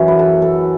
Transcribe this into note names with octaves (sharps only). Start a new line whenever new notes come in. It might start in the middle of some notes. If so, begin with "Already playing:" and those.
Already playing: F#2 E3 F#4
B4
A4
A4